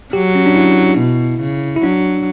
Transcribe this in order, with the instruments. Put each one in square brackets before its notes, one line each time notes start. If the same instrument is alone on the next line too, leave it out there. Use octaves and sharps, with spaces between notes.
[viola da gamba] F#3 [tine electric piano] G4
[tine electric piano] C#4
D4
E4
[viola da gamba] B2
C#3
[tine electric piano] E4
[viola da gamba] F#3 [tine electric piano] D4